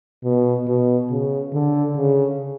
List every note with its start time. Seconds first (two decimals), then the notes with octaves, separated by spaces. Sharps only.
0.24 B2
0.68 B2
1.10 C#3
1.53 D3
1.96 C#3